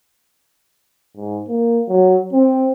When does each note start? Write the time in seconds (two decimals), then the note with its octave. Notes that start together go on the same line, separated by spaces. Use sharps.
1.16 G#2
1.48 A#3
1.88 F#3
2.33 C4